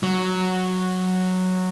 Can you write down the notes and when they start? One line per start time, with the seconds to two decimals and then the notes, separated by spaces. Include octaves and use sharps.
0.03 F#3